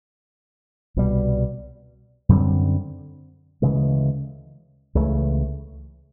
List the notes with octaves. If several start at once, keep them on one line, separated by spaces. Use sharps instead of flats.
C2 B2 G3
F#2 D3 G3 C4
D2 C#3 E3 G#3
C#2 C#3 E3 A3